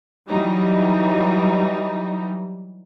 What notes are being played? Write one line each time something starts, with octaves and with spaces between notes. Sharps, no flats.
E3 F#3 G3 D#4